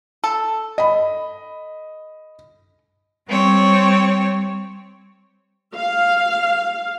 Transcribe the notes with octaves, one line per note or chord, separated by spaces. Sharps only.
A4
D#5 B5
G3 C4 C#5
F5